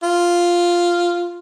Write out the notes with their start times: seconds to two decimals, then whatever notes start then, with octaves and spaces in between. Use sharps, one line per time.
0.03 F4